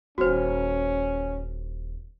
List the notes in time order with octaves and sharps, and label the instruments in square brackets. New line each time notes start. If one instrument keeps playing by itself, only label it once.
[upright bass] D#1 [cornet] C#4 [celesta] F#4 C5